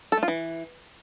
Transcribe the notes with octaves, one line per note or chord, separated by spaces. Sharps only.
A4
A3
F4
E3